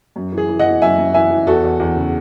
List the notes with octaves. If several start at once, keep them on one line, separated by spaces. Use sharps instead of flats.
F#2
E3
G#4
E3
D#5 F#5
E3
F#2 E5 G#5
F#2
E3 E5 G#5
E3
E2 F#4 A4
E2
E2
C#3